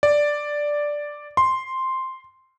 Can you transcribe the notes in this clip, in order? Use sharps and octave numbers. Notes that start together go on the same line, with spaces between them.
D5
C6